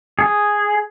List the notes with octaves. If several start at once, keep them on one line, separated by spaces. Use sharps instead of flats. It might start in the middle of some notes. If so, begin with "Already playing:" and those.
G#4